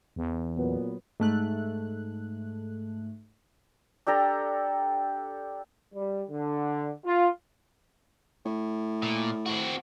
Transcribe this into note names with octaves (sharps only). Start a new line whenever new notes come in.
E2
A#2 F#3 B3
G#2 A3 F#6
D4 G4 A4 A#5
G3
D3
F4
A2
A#2
C4 F#4